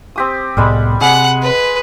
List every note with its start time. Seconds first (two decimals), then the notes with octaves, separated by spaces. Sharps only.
0.16 C4 G4 D#6
0.57 C2 A2 G3 G#3 B3 B5
1.01 C3 G#4 F#5 B5
1.42 B4